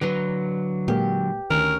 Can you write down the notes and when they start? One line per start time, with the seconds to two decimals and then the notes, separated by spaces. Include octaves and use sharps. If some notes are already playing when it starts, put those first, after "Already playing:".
0.01 D3 F#3 B4 A#5 C6
0.88 A#2 G#3 A#3 G4
1.50 D2 D#3 C#4 A#4